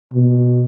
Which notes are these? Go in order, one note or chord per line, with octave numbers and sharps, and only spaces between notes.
B2